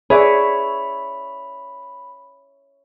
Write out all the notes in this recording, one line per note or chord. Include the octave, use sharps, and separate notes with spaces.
G#4 B4 C#5 D5 E5 B5